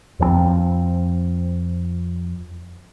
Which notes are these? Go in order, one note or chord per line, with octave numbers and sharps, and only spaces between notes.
F2 F3 G3 C4